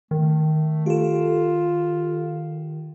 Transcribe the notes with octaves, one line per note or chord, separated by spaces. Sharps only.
D#3 A3
F4 G4 A4